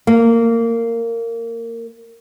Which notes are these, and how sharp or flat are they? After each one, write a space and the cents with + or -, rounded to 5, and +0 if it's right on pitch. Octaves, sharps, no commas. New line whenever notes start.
A#3 -20